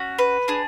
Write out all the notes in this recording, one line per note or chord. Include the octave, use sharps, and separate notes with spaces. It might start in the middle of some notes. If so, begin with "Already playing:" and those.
Already playing: C#4 F#4
B4
D4 G#4